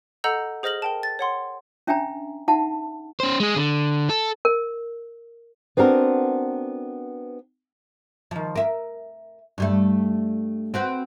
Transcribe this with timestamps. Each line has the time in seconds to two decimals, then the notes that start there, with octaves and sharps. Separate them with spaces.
0.24 A4 D#5 F#5 A#5 E6 G6
0.63 G#4 C5 D#5 F6 A#6 F#7
0.82 A#4 G5 A5
1.03 A6
1.19 C#5 F#5 C6
1.87 C#4 D4 E5 G5 G#5 A#5
2.48 D#4 E5 F#5 A5
3.20 C#4 C5
3.40 G#3 G#4
3.56 D3
4.09 A4
4.45 A#4
5.77 B3 C4 D4 F#4 A#4
8.31 D#3 F3
8.55 A#4 E5
9.58 G2 G3 A3
10.74 C4 F#4 B4